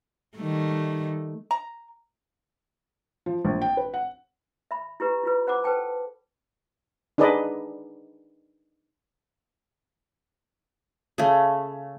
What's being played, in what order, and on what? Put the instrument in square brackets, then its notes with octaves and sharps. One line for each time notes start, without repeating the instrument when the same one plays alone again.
[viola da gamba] D#3 G3 A3
[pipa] A#5
[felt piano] F3
A#1
G5
B4
F#5
[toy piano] E5 B5
E4 G4 B4 A#5
E4 F4 B4
C5 F#5 B5 D6
A4 B4 C5 G5 A5
[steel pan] D4 D#4 G#4 B4 D5 D#5
[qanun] C#3 A3